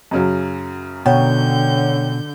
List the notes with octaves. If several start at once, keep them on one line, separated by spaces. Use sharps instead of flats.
F#2 C#3 F#3
B2 D3 C#5 F#5 G5 G6